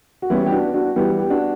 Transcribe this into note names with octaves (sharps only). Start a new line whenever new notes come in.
F#4
E3 G3 B3 C#4 E4
G4
D4 F#4
D4 F#4
E3 G3 B3 E4 G4
G4
D4 F#4